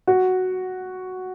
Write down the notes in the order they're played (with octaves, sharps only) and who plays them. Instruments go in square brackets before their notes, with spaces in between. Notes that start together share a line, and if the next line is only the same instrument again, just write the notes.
[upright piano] F#4